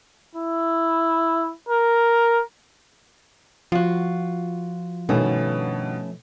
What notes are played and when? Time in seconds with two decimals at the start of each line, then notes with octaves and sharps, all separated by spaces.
0.35 E4
1.69 A#4
3.72 F3 F4 F#4
5.09 G2 B2 D#3 A3 B3 C#4